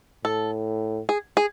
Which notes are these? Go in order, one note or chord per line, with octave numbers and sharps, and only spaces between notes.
A2 A4
G#4
G#4